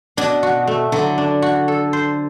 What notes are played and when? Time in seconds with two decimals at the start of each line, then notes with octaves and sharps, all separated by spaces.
0.17 B2 D4
0.43 F#4
0.67 A3
0.92 D3 F#3
1.18 D4
1.42 F#4
1.68 A4
1.93 C5